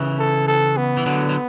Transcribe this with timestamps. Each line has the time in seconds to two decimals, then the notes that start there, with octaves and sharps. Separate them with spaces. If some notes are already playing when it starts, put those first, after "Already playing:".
Already playing: C#3 E3
0.18 A4
0.48 A4
0.77 B3
0.97 E3
1.06 D3 F#3
1.29 F#3